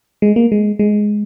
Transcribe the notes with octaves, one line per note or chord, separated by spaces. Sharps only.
G#3
A#3
G#3
G#3